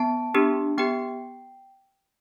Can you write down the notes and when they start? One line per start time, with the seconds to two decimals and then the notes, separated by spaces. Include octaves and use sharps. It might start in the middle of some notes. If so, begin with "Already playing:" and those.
Already playing: B3 A5
0.34 B3 D4 G4
0.78 B3 G4 G5